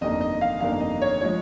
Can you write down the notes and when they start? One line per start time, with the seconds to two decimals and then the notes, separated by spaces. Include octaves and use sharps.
0.01 G1 F2 D#3 A#3 D#5
0.21 D#5
0.41 F5
0.61 G1 F2 D#3 A#3 F5
0.80 D#5
1.02 C#5
1.21 F3 G#3 C#5